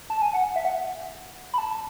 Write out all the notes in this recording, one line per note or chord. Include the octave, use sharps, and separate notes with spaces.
A5
G#5
F#5
E5
F#5
B5
A5